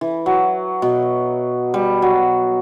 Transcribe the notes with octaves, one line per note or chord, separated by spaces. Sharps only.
E3
F#3
B2
G3
F#3